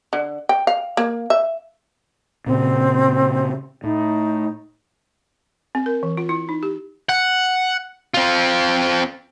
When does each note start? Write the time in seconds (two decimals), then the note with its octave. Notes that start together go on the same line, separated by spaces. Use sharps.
0.13 D3
0.49 G5
0.67 F5
0.97 A#3
1.30 E5
2.46 A#2 C#3 C4
3.84 A2 D#4
5.75 C4
5.86 A#4
6.03 E3
6.17 F4
6.29 E4
6.49 D#4
6.63 G4
7.09 F#5
8.14 C4 F4